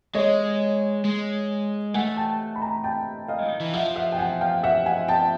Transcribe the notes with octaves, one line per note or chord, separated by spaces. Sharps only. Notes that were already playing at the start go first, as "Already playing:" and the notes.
G#3 C#5 D#5
G#3
A3 F#5 G#5
G5 A5
B5
G#5 A#5
G5 A5
D#5 F5
D#3
E3
F3 E5 F#5
E5 F#5
G5
F#5 G#5
F5 G5
E5 F#5
F#5 G#5
G5 A5